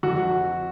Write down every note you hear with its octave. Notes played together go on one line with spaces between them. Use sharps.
F2 F#4